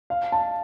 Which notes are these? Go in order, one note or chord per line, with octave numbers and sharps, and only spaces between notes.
F5
A5